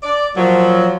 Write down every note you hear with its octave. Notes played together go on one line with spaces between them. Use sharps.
D5
A#2 F3 F#3